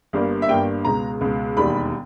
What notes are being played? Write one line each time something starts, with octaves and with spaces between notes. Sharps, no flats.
G1 G2 G3 A#3
E5
G1 G2 G3 A#3 G5
C#2 B2 G#3 A#5
C#2 B2 G#3
E1 D#2 D#3 G3 B5